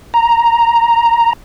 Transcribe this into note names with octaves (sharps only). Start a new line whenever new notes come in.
A#5